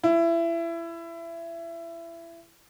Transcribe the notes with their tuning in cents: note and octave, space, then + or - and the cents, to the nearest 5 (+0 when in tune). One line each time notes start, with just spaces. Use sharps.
E4 +25